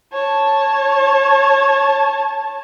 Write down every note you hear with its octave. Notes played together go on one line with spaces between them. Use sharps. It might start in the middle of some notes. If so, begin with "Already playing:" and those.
C#5 A5